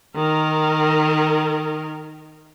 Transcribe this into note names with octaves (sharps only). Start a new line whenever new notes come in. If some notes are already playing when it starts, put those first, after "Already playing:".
D#3 A#4